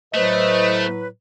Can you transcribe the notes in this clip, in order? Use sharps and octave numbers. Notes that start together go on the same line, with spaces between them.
A2 F#3 A3 B4 C5 D#5